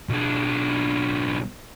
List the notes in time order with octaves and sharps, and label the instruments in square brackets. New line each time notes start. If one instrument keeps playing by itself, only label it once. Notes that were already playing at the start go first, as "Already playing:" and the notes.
[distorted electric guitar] B1 D4